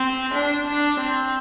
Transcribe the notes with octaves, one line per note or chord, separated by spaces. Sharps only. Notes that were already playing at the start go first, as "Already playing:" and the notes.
Already playing: C4
D4
D4
C4